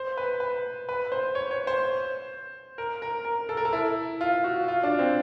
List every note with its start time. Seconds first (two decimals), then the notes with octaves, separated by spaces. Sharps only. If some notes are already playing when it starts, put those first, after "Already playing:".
Already playing: C5
0.17 B4
0.40 B4
0.89 B4
1.12 C5
1.35 C#5
1.51 C#5
1.67 C5
2.78 A#4
3.02 A#4
3.25 A#4
3.49 A4
3.57 A#4
3.65 A4
3.73 E4
4.21 F4
4.44 F#4
4.68 F4
4.83 D4
4.99 C4